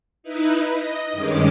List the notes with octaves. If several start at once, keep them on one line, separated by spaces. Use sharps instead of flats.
D#4 E4 B4
D#5
G2 D#3 G#3 C#4 D6